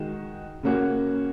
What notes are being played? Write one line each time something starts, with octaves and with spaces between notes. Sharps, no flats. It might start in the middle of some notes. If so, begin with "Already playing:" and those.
Already playing: D#3 G#3 F#4
C#3 A#3 C#4 F#4